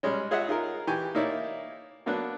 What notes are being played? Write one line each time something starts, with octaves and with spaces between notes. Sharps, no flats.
G3 G#3 C#4
F4 G#4 C#5 D#5 E5 F#5
D#4 F4 G#4 A#4
E3 G4 G#5 C#6
A#3 D#4 E4 C#5 D5
F#3 A#3 B3 D4 B4